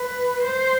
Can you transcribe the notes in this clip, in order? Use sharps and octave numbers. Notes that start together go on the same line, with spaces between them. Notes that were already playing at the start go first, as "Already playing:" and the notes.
Already playing: B4
C5